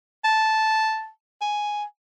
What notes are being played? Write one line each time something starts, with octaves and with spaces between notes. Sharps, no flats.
A5
G#5